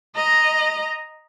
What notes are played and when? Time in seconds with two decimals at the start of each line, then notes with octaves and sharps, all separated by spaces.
0.15 D#5 A#5